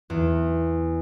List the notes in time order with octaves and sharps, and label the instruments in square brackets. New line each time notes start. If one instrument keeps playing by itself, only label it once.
[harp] E2